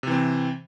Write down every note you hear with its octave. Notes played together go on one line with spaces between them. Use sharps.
C3 E3 C4